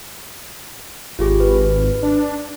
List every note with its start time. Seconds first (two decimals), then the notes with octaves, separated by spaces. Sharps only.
1.19 G#1 F4 G4 G#4
1.40 B4
2.03 D4